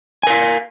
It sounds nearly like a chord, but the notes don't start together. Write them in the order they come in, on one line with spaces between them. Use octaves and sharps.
G#5 A#4 F5